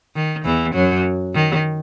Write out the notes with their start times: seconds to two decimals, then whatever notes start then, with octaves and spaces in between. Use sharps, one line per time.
0.15 D#3
0.45 E2 E3
0.75 F#2 F#3
1.35 D#3